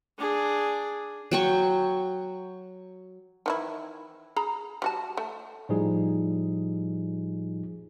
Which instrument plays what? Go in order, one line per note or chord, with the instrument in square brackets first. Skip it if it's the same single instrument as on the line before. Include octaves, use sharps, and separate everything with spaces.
[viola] D4 G#4
[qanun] F#3 G5 C#6
[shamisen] D#3 E3 E4
G#4 A#5 B5
G3 F#4 A5
A3
[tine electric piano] A2 F3 G3 D#4 G#4